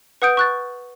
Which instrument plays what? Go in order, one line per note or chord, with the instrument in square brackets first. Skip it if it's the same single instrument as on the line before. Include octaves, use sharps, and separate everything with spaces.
[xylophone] B4 F#5 D#6 G6 D7
C#6 F#6 A6